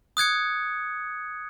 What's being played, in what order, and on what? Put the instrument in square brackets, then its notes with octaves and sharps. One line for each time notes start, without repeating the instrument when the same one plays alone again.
[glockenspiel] D#6 F#6 G#6 C#7